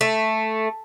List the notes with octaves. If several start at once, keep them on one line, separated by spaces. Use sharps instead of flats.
A3